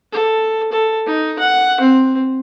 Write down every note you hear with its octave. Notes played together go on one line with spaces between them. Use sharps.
A4
A4
D#4
F#5
C4